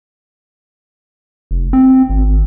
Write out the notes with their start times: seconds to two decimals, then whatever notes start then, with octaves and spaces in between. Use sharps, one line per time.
1.51 F1
1.73 C4
2.10 G#1